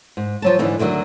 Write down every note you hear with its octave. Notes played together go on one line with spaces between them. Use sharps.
G#2
F3 F#3 A5
G#2 D3 E3 D#4
D2 D3 D#3 F#3